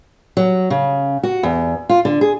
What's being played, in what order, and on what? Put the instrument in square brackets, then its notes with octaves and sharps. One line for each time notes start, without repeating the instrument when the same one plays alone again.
[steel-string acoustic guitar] F#3
C#3
F#4
E2
F4
D3
G#4